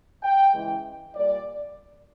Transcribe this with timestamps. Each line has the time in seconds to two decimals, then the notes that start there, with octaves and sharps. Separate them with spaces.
0.23 G5
0.53 C#3 E3 G#3
1.14 A#2 G3 A#3 D5